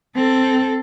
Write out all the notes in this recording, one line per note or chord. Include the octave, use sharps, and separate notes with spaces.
C4 A4